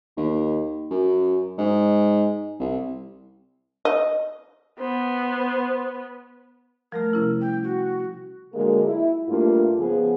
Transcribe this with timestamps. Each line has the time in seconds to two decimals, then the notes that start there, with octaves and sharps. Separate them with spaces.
0.17 D#2
0.91 F#2
1.58 G#2
2.59 C2
3.85 D#5
4.80 B3 C5
6.92 F3 G3 A3 A#4
7.13 C3 C#4 E4
7.41 G5
7.63 F#4
8.54 D3 F#3 G#3 A#3 G#4
8.84 E4
9.28 G2 A3 A#3 F4
9.78 C#3 F3 B3 G#4